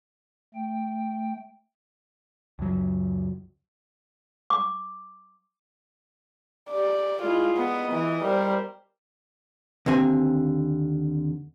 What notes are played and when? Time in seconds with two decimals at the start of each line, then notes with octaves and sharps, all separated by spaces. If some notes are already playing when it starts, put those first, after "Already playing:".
0.55 A3 G5
2.59 C#2 F#2 F#3
4.50 D6
6.71 G4 D5
7.22 G#3 E4 F4
7.57 B3 D#5
7.92 E3
8.24 G3 A#4 C5
9.86 D#2 D3 C4 G#5